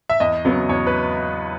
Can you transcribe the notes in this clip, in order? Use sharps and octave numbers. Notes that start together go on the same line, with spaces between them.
E5
E2 D#5
C#3 F#3 B3
E2 C#5
B4